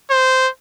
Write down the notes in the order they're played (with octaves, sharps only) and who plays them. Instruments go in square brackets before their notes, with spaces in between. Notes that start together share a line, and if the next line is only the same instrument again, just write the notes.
[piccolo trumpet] C5